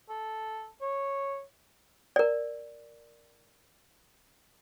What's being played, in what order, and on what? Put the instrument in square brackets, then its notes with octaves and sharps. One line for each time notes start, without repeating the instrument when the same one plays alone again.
[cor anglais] A4
C#5
[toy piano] A#4 D5